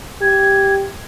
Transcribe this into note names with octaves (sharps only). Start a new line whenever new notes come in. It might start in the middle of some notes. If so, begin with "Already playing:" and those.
G4 G#6